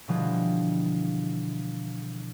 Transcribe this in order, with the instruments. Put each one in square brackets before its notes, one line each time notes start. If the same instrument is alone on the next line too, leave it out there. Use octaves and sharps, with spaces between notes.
[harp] B2 D3 E3 F3 G3 G#3